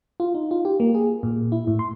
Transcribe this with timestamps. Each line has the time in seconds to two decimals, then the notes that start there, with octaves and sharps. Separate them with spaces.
0.20 F4
0.34 D#4
0.51 F4
0.65 G4
0.80 A#3
0.95 G#4
1.23 A#2
1.52 E4
1.67 A2
1.79 C6